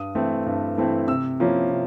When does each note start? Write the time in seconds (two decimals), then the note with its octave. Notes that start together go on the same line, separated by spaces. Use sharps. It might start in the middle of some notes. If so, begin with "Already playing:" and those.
Already playing: G2 D#6
0.15 E3 A3 C4 E4
0.46 G2
0.78 E3 A3 C4 E4
1.08 C3 E6
1.40 F3 A#3 C#4 E4
1.71 C3